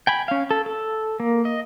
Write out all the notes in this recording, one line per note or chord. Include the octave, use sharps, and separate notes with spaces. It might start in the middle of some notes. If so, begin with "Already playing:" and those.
G5 G#5 B5
C#4 F5
A4
A4
A#3
D#5